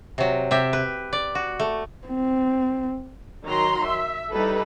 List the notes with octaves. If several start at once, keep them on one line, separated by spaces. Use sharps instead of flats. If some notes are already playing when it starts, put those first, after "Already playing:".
C3 F#3
C3 G4 E5
B4
D5
F#4
A3
C4
D#3 F#3 A#5 C6
E5
G3 D#4 E4 A4 B4